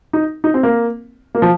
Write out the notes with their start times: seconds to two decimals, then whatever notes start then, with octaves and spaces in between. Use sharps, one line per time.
0.13 D#4
0.44 D#4
0.54 C4
0.63 A#3
1.35 A#3
1.42 F3